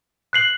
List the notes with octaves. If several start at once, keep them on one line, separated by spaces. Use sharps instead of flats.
F#6 C7 F#7